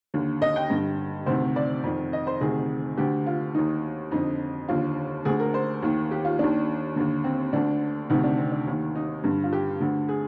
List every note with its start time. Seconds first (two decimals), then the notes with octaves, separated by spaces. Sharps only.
0.14 D#2 D3
0.42 D#5
0.56 G5
0.70 G2 D3
1.26 D2 C3 D#3 C5
1.56 D5
1.83 F2 D#3
2.13 D#5
2.27 C5
2.41 D2 C3 D#3 G#4
2.97 D2 D3 G4
3.26 F4
3.54 D#2 D#3 D#4
4.11 F2 D3 D#4
4.68 D#2 D3 F4
5.25 D2 D3 G#4
5.40 A#4
5.54 C5
5.82 D#2 D#3
6.11 G4
6.25 F4
6.39 D#3 D4
6.43 D#2
6.96 D#2 D3
7.24 C4
7.53 D2 D3 D4
8.10 D2 C3 D#3 D#4
8.24 D4
8.38 C4
8.52 D4
8.67 D#2 D#3
8.95 D#4
9.24 G2 D3
9.44 F4
9.53 G4
9.80 D2 D3
10.09 G#4